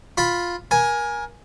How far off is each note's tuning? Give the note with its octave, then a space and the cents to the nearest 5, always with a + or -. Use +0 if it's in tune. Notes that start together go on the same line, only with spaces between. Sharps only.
F4 +5 B5 +0
A#4 +25 G#5 +0